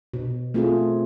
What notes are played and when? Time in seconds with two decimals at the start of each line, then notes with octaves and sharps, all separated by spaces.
0.14 B2
0.54 A3 C4 F4 G#4